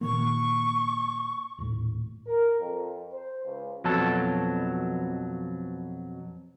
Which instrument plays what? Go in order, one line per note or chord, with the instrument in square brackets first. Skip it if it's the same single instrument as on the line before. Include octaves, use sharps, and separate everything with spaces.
[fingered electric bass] A#2 D#3 A#3 [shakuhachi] C#6
[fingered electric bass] D#1 A2
[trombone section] A#4
F2
C5
C#2
[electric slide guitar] F2 B2 F#3 A4 A5